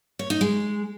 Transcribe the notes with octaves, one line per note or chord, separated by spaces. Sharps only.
C#5
D#4
G#3